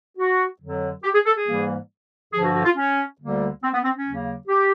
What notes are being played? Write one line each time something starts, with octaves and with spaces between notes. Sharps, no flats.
F#4
F2 D3 F#3
G4
G#4
A4
G#4
G#2 E3 G3 A#3
G2 D3 F3 G#4
F#4
F#4
F4
C#4
D2 D3 G3 A#3
C4
B3
C4
C#4
D#2 C#3 F#3 A#3
G4